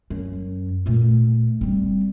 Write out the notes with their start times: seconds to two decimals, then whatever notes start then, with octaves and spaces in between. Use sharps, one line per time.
0.10 F#2
0.86 A#2 A3
1.61 G3 C4